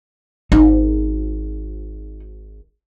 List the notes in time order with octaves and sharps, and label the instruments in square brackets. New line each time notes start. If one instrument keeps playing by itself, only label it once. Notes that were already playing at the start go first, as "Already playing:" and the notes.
[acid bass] G#1 [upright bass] D#4